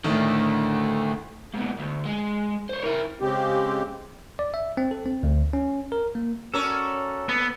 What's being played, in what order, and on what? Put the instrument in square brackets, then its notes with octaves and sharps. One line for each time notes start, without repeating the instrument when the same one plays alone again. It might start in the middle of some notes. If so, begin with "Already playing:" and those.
[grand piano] A2 D#3 [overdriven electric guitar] D3 A3
[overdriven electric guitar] G#2 B2
D2
G#3
C5 C#5
E4 A#4
[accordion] C#3 G#3 C4 G4
[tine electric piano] D5
E5
C4
A4
C4
D2
C#4
A#4
A#3
[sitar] C#4 F#4 A#4 [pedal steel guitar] A4 D5
[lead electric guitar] B3